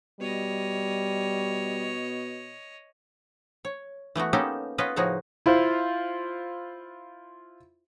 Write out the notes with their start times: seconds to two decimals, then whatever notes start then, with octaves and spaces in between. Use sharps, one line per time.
0.20 B2 G3 C#5 D#5
3.65 C#5
4.15 E3 A3 B3 F#4
4.33 A#3 B3 C#4 D#4 G4 A4
4.78 B3 C#4 F4 B4 D#5
4.96 A2 C#3 F3 D#4 F#4 G#4
5.46 E4 F4 C5